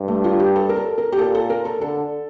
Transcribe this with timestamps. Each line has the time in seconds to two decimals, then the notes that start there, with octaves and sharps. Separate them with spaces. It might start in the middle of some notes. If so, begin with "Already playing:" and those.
Already playing: G2
0.08 A3
0.24 F4
0.40 G4
0.56 A4
0.69 A#4
0.76 A4
0.98 A#4
1.12 G4
1.18 A#2 A4
1.35 A4
1.50 A#4
1.65 A4
1.81 D3 A4